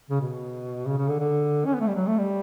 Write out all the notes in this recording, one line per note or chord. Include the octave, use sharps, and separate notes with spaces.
C#3
B2
C#3
C#3
D3
D3
C#4
B3
A3
G3
F#3
A3
G3